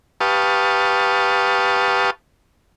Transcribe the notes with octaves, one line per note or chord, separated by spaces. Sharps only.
G4 B4 F5 A5 C#6 D#6